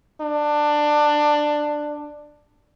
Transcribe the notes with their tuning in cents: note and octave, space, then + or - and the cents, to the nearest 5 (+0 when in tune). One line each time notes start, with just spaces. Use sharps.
D4 +15